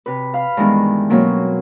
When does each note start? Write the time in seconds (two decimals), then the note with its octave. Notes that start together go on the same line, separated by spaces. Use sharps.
0.06 C3 B4
0.34 F5 B5
0.57 G2 D#3 E3 G#3 B3
1.10 B2 F#3 A#3 C4 C#4